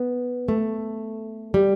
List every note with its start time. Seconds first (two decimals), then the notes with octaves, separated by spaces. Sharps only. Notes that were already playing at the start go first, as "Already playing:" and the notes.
Already playing: B3
0.48 A3
1.54 G3